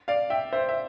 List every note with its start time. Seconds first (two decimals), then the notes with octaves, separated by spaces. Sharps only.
0.08 D5 F5
0.30 E5 G5
0.53 C5 E5
0.69 E5